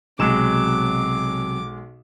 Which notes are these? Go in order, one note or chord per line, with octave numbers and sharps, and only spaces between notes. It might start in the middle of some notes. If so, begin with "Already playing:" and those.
B1 C3 F#3 G#3 D6 E7